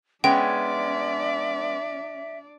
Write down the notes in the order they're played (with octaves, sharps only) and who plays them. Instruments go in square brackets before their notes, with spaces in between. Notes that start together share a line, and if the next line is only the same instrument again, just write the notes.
[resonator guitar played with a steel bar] G#3 B3 C#4 [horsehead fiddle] D4 D5 [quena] E5 [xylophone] G5